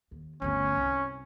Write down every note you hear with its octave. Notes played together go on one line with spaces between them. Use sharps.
D#2
G1 D2 C#4
C2